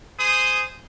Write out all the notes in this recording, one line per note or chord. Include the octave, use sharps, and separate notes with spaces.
G#4 C5 D#6